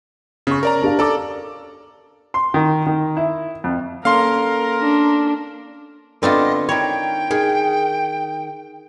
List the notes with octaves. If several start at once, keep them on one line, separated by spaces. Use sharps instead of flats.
C#3 C#4 C#6
A#4 D5 A#5
D4 G4 F5
A4 D5 A#5 D6
C6
D#3
D#3
E4
F2
A#3 C#4 A4 A#4 F5 C6
D4
D3 B3 C4 D4 F4 D#5
D#3 E4 C#5 G5
D#3 G#4